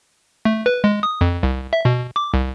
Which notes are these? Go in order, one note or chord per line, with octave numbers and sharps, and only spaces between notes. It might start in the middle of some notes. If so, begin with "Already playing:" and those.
A3
B4
G#3
D#6
F2
C2
E5
B2
D6
C2